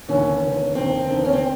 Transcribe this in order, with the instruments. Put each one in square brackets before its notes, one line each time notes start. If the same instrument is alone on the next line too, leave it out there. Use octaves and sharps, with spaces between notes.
[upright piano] F1 D#2 D3 [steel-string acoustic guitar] C#4
[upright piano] F1 D#2 D3
[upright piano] F1 D#2 D3 [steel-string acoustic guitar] C4
[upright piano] F1 D#2 D3
[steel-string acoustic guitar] C#4
C4